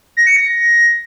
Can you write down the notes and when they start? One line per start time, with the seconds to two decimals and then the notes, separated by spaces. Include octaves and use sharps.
0.17 A#6
0.27 C#7
0.36 A#6